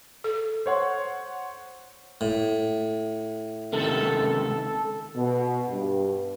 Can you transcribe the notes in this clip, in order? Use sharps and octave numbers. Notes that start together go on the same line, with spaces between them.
A4
C5 C#5 F#5 C6
A2
C#2 C3 D#3 A4
B2
G2